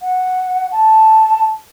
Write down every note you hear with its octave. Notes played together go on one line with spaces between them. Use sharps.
F#5
A5